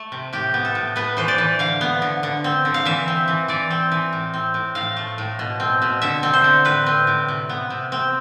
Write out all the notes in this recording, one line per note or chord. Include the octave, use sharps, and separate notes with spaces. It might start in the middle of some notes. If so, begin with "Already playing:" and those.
Already playing: A3
C3
A2 G4
B3
A4
A2
B3 B4
E3 C5
D5
E3
D3 F5
B3
D3
D3
C4
D3
F5
E3 E5
C4
E3
E3 D5
C4
E3
A2
C4
A2
A2 F5
A3
A2
B2
C4
B2
D3 E5
C4
C5
D3
A2 B4
C4
A2
C3
B3
C3
C4